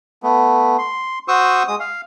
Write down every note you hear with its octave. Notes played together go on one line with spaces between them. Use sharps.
A3 B3
C6
F#4 C5 C#6 D#6 E6
G#3 D#6
F5